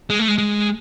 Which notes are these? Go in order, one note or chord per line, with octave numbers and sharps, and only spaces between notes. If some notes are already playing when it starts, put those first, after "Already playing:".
G#3
A3
G#3
G#3